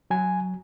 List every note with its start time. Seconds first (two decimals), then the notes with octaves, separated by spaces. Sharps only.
0.10 F#3 G#5